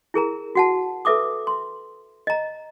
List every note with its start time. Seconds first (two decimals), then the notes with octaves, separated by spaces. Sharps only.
0.14 E4 G#4 A#4 A#5
0.55 F#4 F#5 A5
1.05 A4 B4 E5 D6 D#6
1.47 C6
2.27 D#5 A#5